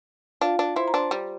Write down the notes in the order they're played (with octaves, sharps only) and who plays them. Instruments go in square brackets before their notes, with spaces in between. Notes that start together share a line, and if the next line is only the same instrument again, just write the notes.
[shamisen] D4 [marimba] F4 F5
[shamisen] D4
[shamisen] E4 [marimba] C5 C6
[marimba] A#5
[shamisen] D4 [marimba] C5 C6
[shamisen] G3